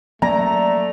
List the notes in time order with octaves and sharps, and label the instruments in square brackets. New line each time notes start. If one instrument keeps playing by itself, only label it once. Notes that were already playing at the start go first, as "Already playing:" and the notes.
[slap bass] F#3 A#3 C#4 [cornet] A3 [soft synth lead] D5 [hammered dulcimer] A#5